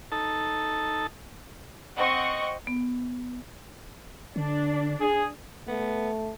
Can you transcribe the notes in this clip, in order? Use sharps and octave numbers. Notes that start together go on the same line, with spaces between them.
D#4 A4 A5
C4 D#5 F#5 C#6 C#7
B3
D3 D4
G#4
A3 B3